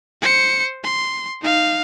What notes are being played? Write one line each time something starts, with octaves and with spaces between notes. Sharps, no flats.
C5 C#7
C6
D#4 F5